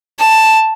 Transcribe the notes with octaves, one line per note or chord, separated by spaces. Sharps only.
A5